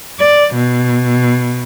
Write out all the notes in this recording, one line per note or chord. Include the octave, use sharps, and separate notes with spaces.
D5
B2